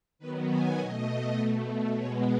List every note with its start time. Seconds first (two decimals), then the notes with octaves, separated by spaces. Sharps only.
0.19 D#3 F#3 B3 B4
0.49 G#5
0.78 B2 A3 D#5
1.38 B2 A3
1.97 B2 G#3 B3 C#5